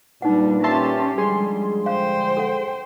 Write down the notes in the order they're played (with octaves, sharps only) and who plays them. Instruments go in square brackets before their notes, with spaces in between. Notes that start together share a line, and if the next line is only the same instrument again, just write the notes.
[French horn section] A#2 A#3 B4 [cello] G3 D4 [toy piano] D#4 F#5
[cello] C#4 G4 [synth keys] E5 A5 C6
[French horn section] D3 F3 G#3 [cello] G3 [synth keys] G#4 C6
[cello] C5 G5 [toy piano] F5
[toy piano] A4 F#5